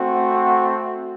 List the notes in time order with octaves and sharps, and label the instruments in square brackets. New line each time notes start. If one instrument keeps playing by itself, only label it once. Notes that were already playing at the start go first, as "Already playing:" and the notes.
Already playing: [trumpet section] A3 C4 F#4